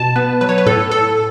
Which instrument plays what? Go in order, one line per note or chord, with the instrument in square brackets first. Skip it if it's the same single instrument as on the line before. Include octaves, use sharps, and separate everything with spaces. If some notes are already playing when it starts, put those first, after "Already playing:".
Already playing: [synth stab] B2 A5
B3 B4
F#3 B4
C#5
B4
A2 A4
A2 A4